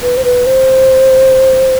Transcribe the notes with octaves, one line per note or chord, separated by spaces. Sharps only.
B4
C5
B4
C5